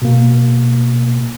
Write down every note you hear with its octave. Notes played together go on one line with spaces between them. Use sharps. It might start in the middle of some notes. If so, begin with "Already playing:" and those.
B2 A#3